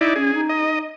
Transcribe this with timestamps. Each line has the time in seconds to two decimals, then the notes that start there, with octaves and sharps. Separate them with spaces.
0.01 D#4 E4 D5
0.16 C#4 G#4
0.34 D#4
0.49 D#5